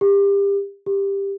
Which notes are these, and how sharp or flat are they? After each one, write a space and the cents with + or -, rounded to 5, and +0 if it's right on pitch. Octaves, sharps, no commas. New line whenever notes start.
G4 +30
G4 +15